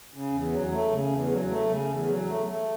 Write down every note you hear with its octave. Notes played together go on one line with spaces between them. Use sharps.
C#3
E2
F#3
A3
C#3
E2
F#3
A3
C#3
E2
F#3
A3
A3